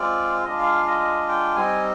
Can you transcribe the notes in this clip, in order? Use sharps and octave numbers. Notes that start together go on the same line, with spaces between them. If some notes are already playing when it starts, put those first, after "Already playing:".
Already playing: G#3 C4 F4 D5
G#3 D4 F4 D#5
F5
F5
D#5
D#5
G5
G3 C4 D#4 G#5